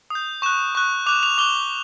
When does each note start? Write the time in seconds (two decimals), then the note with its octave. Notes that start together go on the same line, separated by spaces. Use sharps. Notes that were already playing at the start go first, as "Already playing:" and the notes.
0.10 D#6 G6
0.42 C#6 F#6 E7
0.75 C#6 F#6
1.06 D6 F#6 F7
1.23 F7
1.38 D6 F#6 G7